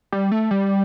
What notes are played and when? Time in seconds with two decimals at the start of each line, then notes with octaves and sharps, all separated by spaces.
0.12 G3
0.32 A3
0.51 G3